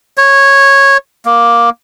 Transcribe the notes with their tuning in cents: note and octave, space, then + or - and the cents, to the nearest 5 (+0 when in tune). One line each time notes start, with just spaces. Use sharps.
C#5 -10
A#3 +10